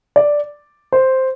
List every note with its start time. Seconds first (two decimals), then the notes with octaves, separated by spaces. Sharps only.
0.16 D5
0.92 C5